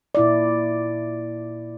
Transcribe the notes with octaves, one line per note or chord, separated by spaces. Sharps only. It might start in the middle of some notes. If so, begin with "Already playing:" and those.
A#2 E4 D5